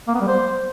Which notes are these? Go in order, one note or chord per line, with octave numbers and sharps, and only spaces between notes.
A#3
B3
G3
C5